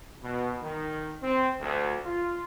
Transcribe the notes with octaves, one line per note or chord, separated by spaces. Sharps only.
B2
D#3
C4
D2
F4